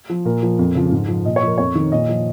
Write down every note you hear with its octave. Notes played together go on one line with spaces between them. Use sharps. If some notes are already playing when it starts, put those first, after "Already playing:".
F3
A#2 A#4
F3
F2
C#3 F3
G#2
F3
A#2 D#5
C#5
F3 A#4
F2 C#5
D#3
A#2 D#5
F3